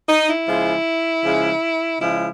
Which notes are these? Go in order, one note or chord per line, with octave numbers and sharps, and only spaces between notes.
D#4
E4
C#3 F3 G#3
C#3 F3 G#3
C#3 F3 G#3 E4